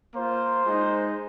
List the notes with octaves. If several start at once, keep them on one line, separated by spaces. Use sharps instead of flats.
A#3 F4 C5
G#3 D#4